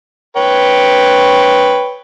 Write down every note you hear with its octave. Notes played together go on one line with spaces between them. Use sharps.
B4 C#5 G5